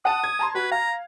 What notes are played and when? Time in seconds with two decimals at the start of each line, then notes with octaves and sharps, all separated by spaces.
0.05 F#5 A5 D#6
0.24 G#6
0.39 A5 A#5 C6
0.55 F#4 B4
0.71 F5 A#5